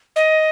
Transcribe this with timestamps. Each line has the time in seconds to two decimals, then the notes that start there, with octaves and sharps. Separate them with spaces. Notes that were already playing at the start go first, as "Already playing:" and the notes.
0.16 D#5